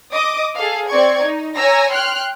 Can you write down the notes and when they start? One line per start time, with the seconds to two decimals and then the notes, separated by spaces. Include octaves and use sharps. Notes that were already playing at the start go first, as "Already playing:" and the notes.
0.13 D#5 D6 D#6
0.56 G#4 A4 F5
0.89 C4 D5 C#6 G#6
1.24 D#4
1.57 C#5 G#5 A#5 E6 A#6
1.93 G5 C6 F6 F#6